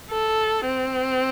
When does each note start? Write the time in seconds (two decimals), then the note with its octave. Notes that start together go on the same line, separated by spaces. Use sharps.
0.11 A4
0.66 C4